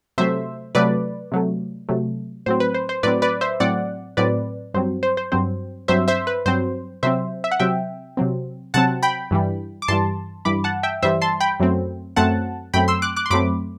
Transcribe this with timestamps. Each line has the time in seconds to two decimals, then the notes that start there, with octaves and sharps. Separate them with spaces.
0.18 C3 F#3 A3 C5 E5
0.75 C3 F#3 A3 B4 D5
1.32 C3 F#3 A3
1.89 C3 F#3 A3
2.46 A2 F#3 C4 C5
2.60 B4
2.74 C5
2.89 C5
3.03 A2 F#3 C4 B4 D5
3.22 B4 D5
3.41 C5 E5
3.60 A2 F#3 C4 D5 F#5
4.17 A2 F#3 C4 B4 D5
4.74 G2 F#3 C4 C5
5.03 C5
5.17 C5
5.32 G2 F#3 C4 C5
5.88 G2 F#3 C4 C5 E5
6.08 C5 E5
6.27 B4
6.46 G2 F#3 C4 C5
7.03 C3 F#3 C4 C5 E5
7.44 E5
7.52 F#5
7.60 C3 F#3 C4 E5 G5
8.17 C3 F#3 C4
8.74 C3 F#3 C4 F#5 A5
9.03 G5 B5
9.31 G2 E3 G3
9.82 D6
9.88 G2 E3 G3 A5 C6
10.45 G2 E3 G3 B5 D6
10.64 F#5 A5
10.83 E5 G5
11.02 G2 E3 G3 C5 E5
11.22 A5 C6
11.40 G5 B5
11.60 F#2 F#3 A3 C4
12.16 F#2 F#3 A3 C4 F#5 A5
12.74 F#2 F#3 A3 C4 G5 B5
12.88 C6 E6
13.02 D6 F#6
13.16 D6 F#6
13.26 C6
13.30 F#2 F#3 A3 C4 B5 D6